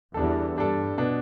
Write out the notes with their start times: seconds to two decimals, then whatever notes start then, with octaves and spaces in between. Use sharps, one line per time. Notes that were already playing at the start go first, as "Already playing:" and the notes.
0.14 E2 G3 D4 A4
0.56 G2 G3 D4 A4
0.98 B2 B3 D4